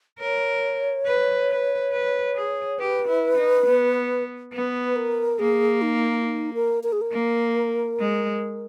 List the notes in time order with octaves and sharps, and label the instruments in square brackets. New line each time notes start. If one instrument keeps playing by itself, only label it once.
[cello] A#4 [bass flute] C#5
[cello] B4
B4
B4
G#4
[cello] G4 [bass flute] B4
[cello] E4
D#4
B3
[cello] B3 [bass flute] B4
[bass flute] A#4
[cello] A#3 [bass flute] G#4
[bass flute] D#4
E4
D#4
A#4
A#4
G#4
A#4
[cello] A#3
G#3